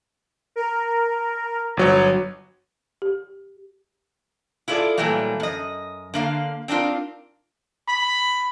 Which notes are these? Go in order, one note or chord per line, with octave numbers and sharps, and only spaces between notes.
A#4
G1 F#3 C#5
G4
E4 F4 G#4 A4 D5
A#2 E3 F#3 G3 A3 A#3
F#2 D#5
D3 A#3 F5
C4 D4 D#4 F4 A#4
B5